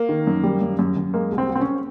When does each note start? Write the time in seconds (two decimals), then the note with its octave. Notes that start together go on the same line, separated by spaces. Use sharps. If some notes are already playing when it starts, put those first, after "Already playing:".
Already playing: A#3
0.09 D#3
0.27 F#2
0.43 G3
0.61 F#2
0.79 F#2
0.97 F#2
1.14 G#3 A#3
1.32 C2
1.38 C4
1.49 C2
1.55 C4
1.61 C#4